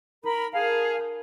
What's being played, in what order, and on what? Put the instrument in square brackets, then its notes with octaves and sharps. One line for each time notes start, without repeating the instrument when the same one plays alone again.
[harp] D#4 [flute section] A#4 B5
[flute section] G#4 F5 [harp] A#4 A5 B5
[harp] B5 D#6 G6